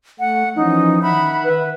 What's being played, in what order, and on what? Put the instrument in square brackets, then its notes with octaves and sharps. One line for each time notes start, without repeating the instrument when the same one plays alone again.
[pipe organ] A3 [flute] F#5
[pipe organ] E3 F3 C#4 [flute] D#4
[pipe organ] D#3 E5 F#5 [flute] B5
[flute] B4